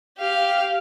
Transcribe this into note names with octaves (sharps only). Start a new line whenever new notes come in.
G4 F5